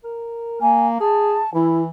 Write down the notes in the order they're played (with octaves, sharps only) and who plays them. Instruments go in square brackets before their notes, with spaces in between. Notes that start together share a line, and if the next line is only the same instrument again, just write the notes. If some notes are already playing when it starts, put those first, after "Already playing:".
[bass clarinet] A#4
[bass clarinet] A#3 [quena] G#5
[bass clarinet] G#4 [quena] A5
[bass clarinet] E3 [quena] E4